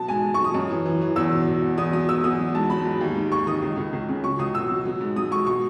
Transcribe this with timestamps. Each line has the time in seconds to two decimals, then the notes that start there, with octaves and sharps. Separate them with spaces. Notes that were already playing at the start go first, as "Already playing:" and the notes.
Already playing: B2 F#3 A5
0.08 G#2 G#5
0.24 G#2
0.34 F#3 C#6
0.44 D#6
0.54 F#2
0.70 E3
0.86 E3
1.01 E3
1.16 E2 E6
1.32 B2
1.47 B2
1.62 E2
1.78 E2 D#6
1.93 F#3 D#6
2.09 E2 E6
2.24 E2 D#6
2.39 F#3
2.55 G#2 A5
2.70 F#3 B5
2.85 G#2
3.01 D#2
3.16 D#3
3.32 D#2 C#6
3.47 D#3 D#6
3.62 C#2
3.77 C#2
3.93 C#2
4.09 C#3
4.24 F#3 C#6
4.39 C#2 D#6
4.54 B2 E6
4.70 F#3
4.85 F#3
5.01 G#2
5.16 F#3 D#6
5.31 G#2 C#6
5.47 B2 C#6